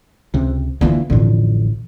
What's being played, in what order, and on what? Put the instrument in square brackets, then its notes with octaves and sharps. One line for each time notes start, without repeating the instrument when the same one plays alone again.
[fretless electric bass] C#2 C3
[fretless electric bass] D3 E3 [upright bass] A#3 F4
[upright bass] A1 [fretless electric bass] F2 D3